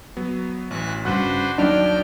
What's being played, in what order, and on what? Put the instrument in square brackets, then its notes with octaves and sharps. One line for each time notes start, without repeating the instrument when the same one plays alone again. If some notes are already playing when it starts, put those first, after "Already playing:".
[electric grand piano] F#3 B3
[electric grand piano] A1 [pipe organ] E3 F#4 F#6
[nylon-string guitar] G2 C#3 [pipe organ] D4 B4 C5 [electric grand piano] F#4 F#5 [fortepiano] F#6
[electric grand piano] D#2 D#4 [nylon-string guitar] F#3 [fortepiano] D4 [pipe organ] G5 F6